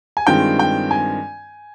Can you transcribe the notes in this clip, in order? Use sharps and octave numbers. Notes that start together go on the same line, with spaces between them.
G#5
G2 D#3 G#3 C4 F4 G5
G5
G#5